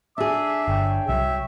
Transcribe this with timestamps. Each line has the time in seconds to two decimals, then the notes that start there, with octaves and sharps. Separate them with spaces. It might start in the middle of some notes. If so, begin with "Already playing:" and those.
0.18 D4 G#4 E5 D6
0.68 G1 C#5 G5
1.08 C2 F#3 G3 E5